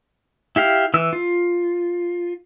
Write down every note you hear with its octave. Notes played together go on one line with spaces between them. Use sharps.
E4 G4 F5
E3 E6
F4